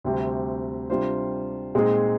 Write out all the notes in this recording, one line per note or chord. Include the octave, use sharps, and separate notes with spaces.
D2 C3 G3 C4 G4
C3 G3 D4 F4 C5
A#2 G#3 C4 D#4 G#4